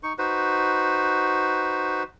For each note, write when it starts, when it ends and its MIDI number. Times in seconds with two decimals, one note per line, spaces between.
0.03 0.13 63
0.03 0.13 85
0.18 2.03 63
0.18 2.03 66
0.18 2.03 71
0.18 2.03 72